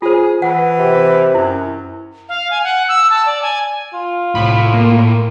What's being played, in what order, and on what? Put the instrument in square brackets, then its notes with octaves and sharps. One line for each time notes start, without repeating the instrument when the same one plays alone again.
[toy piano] F4 C5 [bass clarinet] G#4
[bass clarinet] E3 [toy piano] F#5
[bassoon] C3
[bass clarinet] F#2 [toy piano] E4
[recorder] F5
G#5
F#5
E6
A5
D5
G#5
[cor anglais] F4
[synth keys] C2 B5 [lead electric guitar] A2
[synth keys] A#3